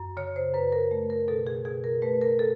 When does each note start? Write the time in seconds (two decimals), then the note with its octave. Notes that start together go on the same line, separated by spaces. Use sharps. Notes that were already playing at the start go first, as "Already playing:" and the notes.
Already playing: F#2
0.17 C#3 C#5
0.36 C5
0.54 F#2 B4
0.72 A#4
0.91 A3
1.10 A#4
1.28 B2 A4
1.47 G#4
1.65 B2 G#4
1.84 A#4
2.02 A3 B4
2.21 A#4
2.39 A4